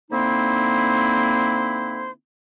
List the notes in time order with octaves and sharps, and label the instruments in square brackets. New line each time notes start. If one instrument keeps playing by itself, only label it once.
[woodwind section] D3 A#3 C4 D#4 E4 C5